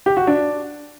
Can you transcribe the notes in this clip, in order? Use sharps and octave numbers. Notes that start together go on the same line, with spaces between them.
G4
F#4
D4